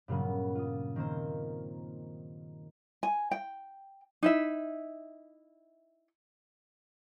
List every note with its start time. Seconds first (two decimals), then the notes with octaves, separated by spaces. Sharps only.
0.08 G2 A#2 C#3 F#3 B3
0.55 F4 D#6
0.96 D#3 A#3 C4 C5
3.03 G#5
3.31 G5
4.23 D#4 E4 E5